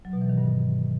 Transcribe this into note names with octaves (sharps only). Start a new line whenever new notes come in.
F#3
B2
E3
D#3
G2